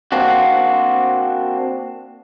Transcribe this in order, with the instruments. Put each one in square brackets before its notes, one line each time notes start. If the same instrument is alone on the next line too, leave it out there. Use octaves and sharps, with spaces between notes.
[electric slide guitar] A#3 C4 D4 F#4